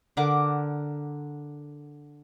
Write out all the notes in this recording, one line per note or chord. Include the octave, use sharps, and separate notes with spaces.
D3 A#4 F#5 D6